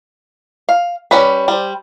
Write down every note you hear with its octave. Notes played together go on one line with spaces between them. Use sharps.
F5
G3 C#4 B4
G3 C5